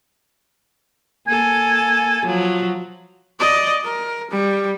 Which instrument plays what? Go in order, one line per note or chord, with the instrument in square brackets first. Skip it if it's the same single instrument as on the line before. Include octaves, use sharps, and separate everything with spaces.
[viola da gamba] A#3 A4 [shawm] G#5
[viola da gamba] F3 F#3
[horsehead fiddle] D5 D#5
A#4
G3